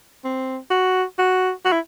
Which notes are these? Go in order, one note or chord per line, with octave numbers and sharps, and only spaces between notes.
C4
F#4
F#4
F#4
E4